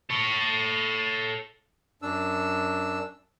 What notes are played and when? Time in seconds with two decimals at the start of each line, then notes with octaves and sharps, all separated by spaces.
0.10 A4 C#5
2.02 F#2 D4 E6